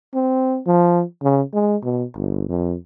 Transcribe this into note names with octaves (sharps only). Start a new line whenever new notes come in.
C4
F3
C#3
G#3
B2
G1
F2